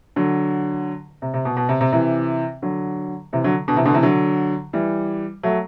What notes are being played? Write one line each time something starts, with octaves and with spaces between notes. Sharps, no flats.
D3 F#3
C3
C3
B2
B2
C3
C3
C3 E3
D3 F#3
C3 E3
D3 F#3
B2 D3
C3 E3
B2 D3
C3 E3
D3 F#3
E3 G3
F#3 A3